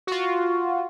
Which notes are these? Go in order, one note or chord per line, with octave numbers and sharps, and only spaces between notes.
F4 F#4